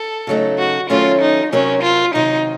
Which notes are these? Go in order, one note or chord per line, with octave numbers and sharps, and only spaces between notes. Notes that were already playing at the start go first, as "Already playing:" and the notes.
Already playing: A4
C#3 F#3 A3 D#4
F#4
D#3 F#3 A3 C#4 F4
D#4
C3 F#3 C4 C#4 F#4 A#4
F4
C3 D#3 F#3 D#4